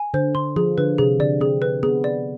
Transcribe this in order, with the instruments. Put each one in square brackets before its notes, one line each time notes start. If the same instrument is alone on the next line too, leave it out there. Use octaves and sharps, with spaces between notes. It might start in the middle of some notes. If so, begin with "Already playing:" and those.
Already playing: [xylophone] G#5
[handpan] D3 [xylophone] C5
[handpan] D3 [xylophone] C6
[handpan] F3 [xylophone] G#4
[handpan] D3 [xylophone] B4
[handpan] C3 [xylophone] G#4
[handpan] D3 [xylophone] D5
[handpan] C4 [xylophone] G#4
[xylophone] B4
[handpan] B3 [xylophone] G#4
[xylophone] D5